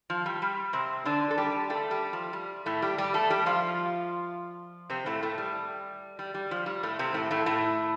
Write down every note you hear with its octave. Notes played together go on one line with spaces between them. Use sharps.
F3
G3
G3
C3 C4
D3 D4
A4
G3 G4
A3 A4
G3 G4
F3
G3
A2 A3
G3 G4
G3 G4
A3 A4
G3 G4
F3 F4
C3 C4
A2 A3
A2 A3
G3
G3
G3
F3
G3
A2 A3
C3 C4
A2 A3
A2 A3
A2 A3